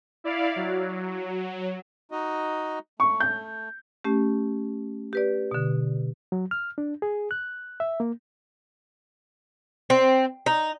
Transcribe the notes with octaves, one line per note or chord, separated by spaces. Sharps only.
E4 D5 F5
F#3
D#4 F#4 D#5
A3 C#6
G6
A3 C#4 G4
G4 B4 D5
B2 D3
F#3
F6
D4
G#4
F#6
E5
A#3
C4
D#4